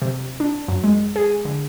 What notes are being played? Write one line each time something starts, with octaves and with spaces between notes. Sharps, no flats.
C3
D4
F#2
G#3
G#4
D3